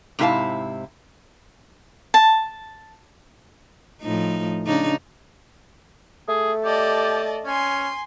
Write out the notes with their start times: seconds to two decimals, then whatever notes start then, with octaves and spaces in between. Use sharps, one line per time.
0.19 G#2 C3 E4 G#4 F5 A5
2.14 A5
4.02 A2 F3 D#4
4.66 C#3 D4 D#4
6.29 A3 G#4
6.65 G4 D5 D#5 A5
7.45 C#4 G#5 C6